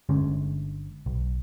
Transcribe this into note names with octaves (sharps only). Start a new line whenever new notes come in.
G1 D3 G#3 C#4
B1